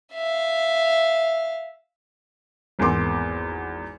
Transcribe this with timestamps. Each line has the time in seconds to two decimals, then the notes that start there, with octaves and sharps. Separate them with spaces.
0.13 E5 F5
2.79 G#1 E2 A#3 C4 C6 D6